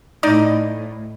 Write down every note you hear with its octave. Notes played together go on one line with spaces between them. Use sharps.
A2 D#4 D5 D#5